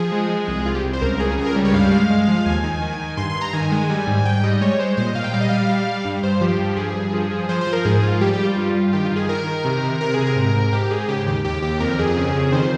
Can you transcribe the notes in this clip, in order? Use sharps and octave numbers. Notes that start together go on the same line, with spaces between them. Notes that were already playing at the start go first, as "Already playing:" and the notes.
Already playing: F3 G#4
G#3
G#3
C2
C2 F4
G4
C2
C5
C#2 A#4
C#3 G#4
C#2 G#4
A#4
G3
C#5
G2 F5
G#3
G#3
F3
D#2 G#5
D#3
D#3
D#3
G2 C6
C6
G2
A#5
D#3 G#5
G#3
G3
G#2
G#2 G5
G3 D#5
G#3 C#5
G#3 C5
A#2 C5
D#5
A#2 F5
G5
G3 F5
D#5
G3 F5
G3
G3
G2
G2 C5
F3 G4
G2
G2 G#4
G2
F3
F3
F3 C5
C5
F3
A#4
G#2 G#4
G#2 F4
G3 G4
G4
G3
F4
G2
G2
D#3 G4
F4
D#3
G#4
D#3 A#4
D#3
C3
C3
C3 A#4
C3 G#4
A#4
G#2
G#2
G#2 G4
G#2 G#4
C#3 G4
D#2 G4
D#2 G4
D#2 G4
F2 A#4
F2 G#4
C#3
F2
D#3 C5